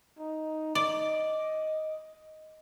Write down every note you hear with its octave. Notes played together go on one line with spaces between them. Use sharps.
D#4
D5 D#5